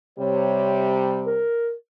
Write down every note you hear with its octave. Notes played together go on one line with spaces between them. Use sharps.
C3 G3 C#5
A#4